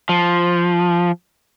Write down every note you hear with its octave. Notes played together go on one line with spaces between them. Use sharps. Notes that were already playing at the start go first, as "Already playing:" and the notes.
F3